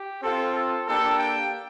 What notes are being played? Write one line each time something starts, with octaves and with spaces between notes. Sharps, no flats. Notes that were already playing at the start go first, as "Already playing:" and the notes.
Already playing: G4
C4 F4 A4
A4
A#3 D4 G4 A4
G5